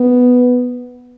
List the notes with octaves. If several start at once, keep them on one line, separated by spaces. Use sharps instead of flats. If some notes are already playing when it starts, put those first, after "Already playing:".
Already playing: B3